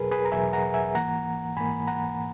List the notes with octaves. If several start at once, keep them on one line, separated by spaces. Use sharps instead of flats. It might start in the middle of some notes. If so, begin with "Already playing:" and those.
Already playing: E2 B2 F#3 G#4 A#4 B4
G#4 B4
A#5
E2 B2 F#3 E5 G#5
F#5 A#5
E5 G#5
G#2 E3 A#3 F#5 A#5
G#2 E3 A#3 G#5 B5
F#5 A#5